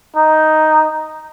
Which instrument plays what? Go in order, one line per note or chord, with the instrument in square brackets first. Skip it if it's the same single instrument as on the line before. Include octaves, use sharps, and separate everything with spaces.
[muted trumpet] D#4